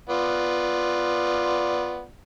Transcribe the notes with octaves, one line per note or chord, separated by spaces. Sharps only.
B3 F4 D5